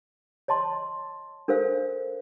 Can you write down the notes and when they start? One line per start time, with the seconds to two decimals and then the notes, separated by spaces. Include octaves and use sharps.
0.48 C#5 D#5 A5 C6
1.48 D4 A4 A#4 C5 F5